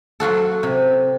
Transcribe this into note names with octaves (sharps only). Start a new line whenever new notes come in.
F#3 F4 F#4 A4
C3